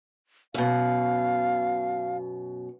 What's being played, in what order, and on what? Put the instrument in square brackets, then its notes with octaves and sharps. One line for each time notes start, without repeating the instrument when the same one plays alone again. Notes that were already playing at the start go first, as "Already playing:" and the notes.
[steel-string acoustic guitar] F#2 B2 [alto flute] F5